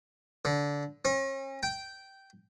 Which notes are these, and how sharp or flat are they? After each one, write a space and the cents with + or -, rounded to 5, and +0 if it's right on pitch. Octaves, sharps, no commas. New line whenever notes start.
D3 -20
C#4 -40
G5 -10